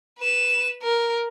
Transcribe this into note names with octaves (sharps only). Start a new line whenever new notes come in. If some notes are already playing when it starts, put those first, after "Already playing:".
B4 E7
A#4